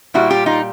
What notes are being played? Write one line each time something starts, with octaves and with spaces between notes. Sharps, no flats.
A#2 G3 E4 F#4
F4 G4
D#4 F4